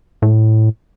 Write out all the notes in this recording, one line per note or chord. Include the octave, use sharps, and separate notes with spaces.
A2